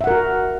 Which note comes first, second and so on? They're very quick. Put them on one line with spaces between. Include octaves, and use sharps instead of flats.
E5 F#5 A#4 F#4